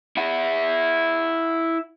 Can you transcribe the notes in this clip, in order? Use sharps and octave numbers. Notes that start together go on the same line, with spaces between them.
E4 F#5